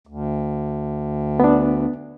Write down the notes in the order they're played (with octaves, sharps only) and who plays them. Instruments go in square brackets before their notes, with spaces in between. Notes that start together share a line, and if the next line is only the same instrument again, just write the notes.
[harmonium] D2
[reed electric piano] B3 D4